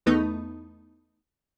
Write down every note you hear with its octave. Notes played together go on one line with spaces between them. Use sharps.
E2 A3 B3 D#4